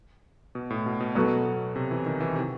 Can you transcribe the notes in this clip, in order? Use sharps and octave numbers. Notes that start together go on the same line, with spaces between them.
B2
A2
B2
B2
B2 F#3 B3 F#4 A4
B2
C3
E3
D#3
E3
C3